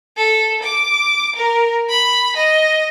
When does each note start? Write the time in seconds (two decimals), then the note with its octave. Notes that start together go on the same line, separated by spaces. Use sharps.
0.17 A4
0.63 D6
1.36 A#4
1.89 B5
2.37 D#5